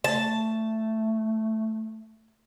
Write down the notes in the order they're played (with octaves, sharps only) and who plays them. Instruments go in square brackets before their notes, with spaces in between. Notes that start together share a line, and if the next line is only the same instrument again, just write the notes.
[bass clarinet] A3 [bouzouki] A5